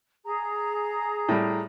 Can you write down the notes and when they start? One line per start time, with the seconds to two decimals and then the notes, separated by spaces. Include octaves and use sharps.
0.24 G#4 A#5
1.29 A2 G3